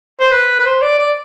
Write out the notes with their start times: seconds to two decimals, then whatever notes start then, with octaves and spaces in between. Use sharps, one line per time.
0.20 C5
0.31 B4
0.59 B4
0.65 C5
0.82 D5
0.99 D5